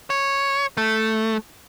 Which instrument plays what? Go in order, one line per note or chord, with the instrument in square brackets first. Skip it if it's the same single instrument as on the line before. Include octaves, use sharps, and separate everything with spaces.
[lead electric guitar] C#5
A3